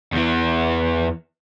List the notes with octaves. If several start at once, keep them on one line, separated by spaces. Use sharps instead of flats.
E2 E3